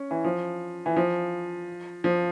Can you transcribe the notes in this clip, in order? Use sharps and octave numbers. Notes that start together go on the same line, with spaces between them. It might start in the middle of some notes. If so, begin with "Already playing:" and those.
Already playing: C#4
E3
F3
E3
F3
F3